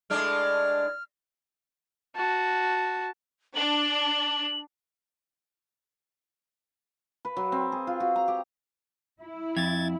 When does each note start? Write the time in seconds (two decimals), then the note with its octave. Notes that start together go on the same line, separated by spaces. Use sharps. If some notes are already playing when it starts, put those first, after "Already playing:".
0.10 A2 G#3 D4 F6
2.16 F#4 A5
3.55 D4 F#7
7.25 B4
7.36 F#3
7.52 C4
7.72 G#4
7.87 F4
8.00 F#4
8.16 A#5
8.28 G4
9.20 E4
9.57 F2 G#6 A6